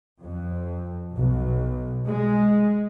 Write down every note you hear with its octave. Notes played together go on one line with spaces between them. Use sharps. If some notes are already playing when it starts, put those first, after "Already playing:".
F2
B1
G#3